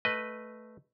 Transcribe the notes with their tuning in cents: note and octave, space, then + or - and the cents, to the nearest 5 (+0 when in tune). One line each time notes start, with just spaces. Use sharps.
A3 +0 B4 +0 D#5 +0